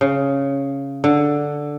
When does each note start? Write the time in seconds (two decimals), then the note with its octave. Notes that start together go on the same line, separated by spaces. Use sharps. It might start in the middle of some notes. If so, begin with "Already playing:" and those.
0.01 C#3
1.04 D3